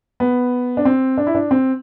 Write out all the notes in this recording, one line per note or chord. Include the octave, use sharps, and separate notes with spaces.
B3
D4
C4
D4
E4
D4
C4